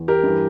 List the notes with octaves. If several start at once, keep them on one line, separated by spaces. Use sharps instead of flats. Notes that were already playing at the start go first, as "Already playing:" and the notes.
Already playing: E2
G4 A#4
G2 E3